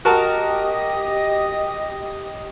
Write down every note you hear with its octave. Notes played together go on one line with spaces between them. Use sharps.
F#4 G4 A#4 D#5 A5 D#6